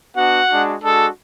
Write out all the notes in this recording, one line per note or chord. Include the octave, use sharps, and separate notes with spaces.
B3 D4 F#4 F#5
G#3 D4 F#4
G#3 D4 F#4 A4